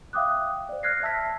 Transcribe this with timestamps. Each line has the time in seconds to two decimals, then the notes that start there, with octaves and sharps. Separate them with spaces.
0.13 E5 F5 G5 D6 D#6 F#6
0.69 C5 D5
0.83 F6 F#6 G#6 A#6 C7
1.03 E5 A5 E6 G#6 A#6 B6